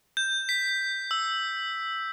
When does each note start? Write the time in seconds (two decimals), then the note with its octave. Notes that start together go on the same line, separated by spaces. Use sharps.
0.17 G6
0.49 B6
1.11 E6